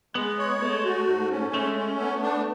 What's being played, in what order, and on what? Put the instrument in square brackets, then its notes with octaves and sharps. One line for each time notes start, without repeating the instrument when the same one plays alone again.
[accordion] G#3 [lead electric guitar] B3
[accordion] C#5
[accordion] G#3 [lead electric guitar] A3
[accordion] F#4
G#2
C#4
[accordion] G#3 [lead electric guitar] A3
[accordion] C#4
B3
D4